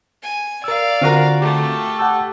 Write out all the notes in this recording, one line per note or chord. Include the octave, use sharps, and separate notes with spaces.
G#5
A#4 D5 F5 E6
D3 C4 F4 F#4 A#4
A3 G4
F#5 A5 E6